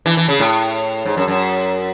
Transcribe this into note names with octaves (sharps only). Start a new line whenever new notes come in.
E3
E3
C#3
A2
G#2
F#2
F#2